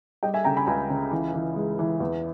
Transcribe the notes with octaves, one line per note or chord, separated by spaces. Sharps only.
G3 D#5 G5
E5 G#5
C#3 G5 A#5
G#5 B5
C#2 G#5 B5
C#3
E3
E3
G#3
E3
E2